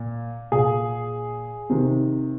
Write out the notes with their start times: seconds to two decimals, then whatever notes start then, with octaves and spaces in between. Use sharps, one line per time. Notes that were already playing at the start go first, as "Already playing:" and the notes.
Already playing: A#2
0.52 A#2 G#4
1.70 C3 D#3